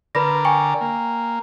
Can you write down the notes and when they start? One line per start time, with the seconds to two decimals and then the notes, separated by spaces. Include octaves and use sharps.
0.15 D3 A#4 B4 D5 B5 A#6
0.45 G5 G#5 C#6
0.81 A#3